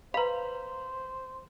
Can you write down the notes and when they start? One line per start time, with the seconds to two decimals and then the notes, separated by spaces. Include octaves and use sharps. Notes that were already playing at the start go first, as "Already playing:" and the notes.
0.14 B4 C5 F5 A#5 B5